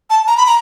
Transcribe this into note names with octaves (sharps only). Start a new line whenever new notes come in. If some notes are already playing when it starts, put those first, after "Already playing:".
A5
A#5
B5
A#5